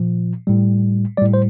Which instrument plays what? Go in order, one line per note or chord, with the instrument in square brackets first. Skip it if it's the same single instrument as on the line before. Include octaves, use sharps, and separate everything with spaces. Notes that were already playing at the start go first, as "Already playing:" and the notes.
Already playing: [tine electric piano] A#2 F3
A2 G3
A2 G3 D5
C5